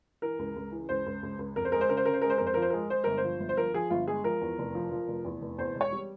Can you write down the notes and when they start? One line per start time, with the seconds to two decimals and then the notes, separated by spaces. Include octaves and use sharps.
0.22 E3 A#4
0.39 C#2
0.56 C#2
0.72 E3
0.89 C#2 C5
1.06 C#2
1.23 C#2
1.39 C#2
1.56 F2 A#4
1.65 C5
1.72 G#3 A#4
1.81 C5
1.89 C#3 A#4
1.97 C5
2.05 C#3 A#4
2.13 C5
2.22 G#3 A#4
2.30 C5
2.38 F2 A#4
2.46 C5
2.54 F3 A#4
2.62 C5
2.70 G#3 A#4
2.90 G#3 C5
3.04 G1 A#4
3.17 C5
3.24 F3
3.40 G1
3.49 C5
3.57 F3 A#4
3.74 F3 G#4
3.90 G1 F4
4.07 G#3 G#4
4.24 F3 A#4
4.41 E2
4.58 F1
4.75 F3
4.91 F3
5.08 F1
5.25 E2
5.42 F1
5.58 E2 C5
5.75 E1
5.81 C#5
5.92 G3